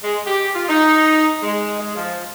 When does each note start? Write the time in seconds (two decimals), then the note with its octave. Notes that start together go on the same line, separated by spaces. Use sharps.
0.03 G#3
0.26 G4
0.54 F4
0.69 D#4
1.43 G#3
1.80 G#3
1.95 F3